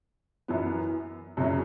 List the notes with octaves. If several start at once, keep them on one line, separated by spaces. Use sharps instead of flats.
F#2 E3 B3
F#2 C#3 F#3 C#4 E4